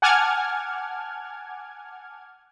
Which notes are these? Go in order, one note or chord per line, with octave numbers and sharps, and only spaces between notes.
F#5 G#5 A5 D6 F6 G#6